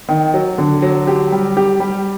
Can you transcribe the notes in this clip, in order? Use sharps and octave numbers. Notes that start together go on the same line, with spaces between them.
D#3
F#3
D3
F#3
G4
G3
G4
G3